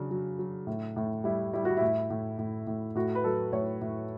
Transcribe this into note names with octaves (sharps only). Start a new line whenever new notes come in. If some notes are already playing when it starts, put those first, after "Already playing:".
Already playing: C#3 F#3 D4
F#3
F#3
A2
A2
G3 E4
G3 E4
F#4
A2 E4
A2
A2
A2
A2 F#4
B4
F#3 A4
A2 C#5
A2